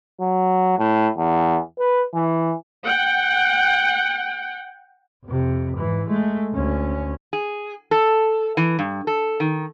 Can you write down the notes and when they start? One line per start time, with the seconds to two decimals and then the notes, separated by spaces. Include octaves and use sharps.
0.21 F#3
0.79 A2
1.18 E2
1.79 B4
2.14 E3
2.85 F#5 G5
5.25 F2 C3
5.76 G#2 E3
6.07 G#3 A3
6.54 D2 C#4
7.33 G#4
7.91 A4
8.57 E3
8.79 G2
9.07 A4
9.40 D#3